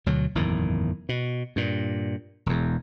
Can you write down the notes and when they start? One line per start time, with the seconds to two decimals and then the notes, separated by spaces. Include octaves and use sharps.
0.06 D2 B2 F#3
0.35 F#1 E2 A2 D#3
1.09 B2
1.56 G2 A#2
2.46 E1 E2